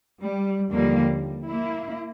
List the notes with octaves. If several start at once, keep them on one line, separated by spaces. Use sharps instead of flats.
G3
D#2 D3 F3 G3 A#3
G3
A#3 E4